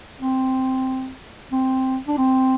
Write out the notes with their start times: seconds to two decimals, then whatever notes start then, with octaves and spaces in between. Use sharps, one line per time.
0.21 C4
1.52 C4
2.08 D4
2.18 C4